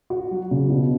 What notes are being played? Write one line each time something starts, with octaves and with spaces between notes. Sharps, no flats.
F#4
F#3
C#3
B2